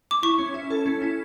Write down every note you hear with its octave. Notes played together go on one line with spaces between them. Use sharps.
D6
E4 C#6
C#4
E4
A4
C#4
E4